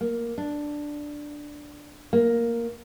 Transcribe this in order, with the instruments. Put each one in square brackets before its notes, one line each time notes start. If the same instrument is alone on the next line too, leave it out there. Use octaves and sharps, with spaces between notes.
[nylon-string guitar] A#3
D4
A#3